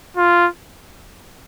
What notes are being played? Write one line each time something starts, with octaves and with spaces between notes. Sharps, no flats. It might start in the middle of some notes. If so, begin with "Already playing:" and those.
F4